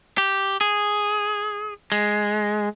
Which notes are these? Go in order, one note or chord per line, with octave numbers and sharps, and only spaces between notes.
G4
G#4
G#3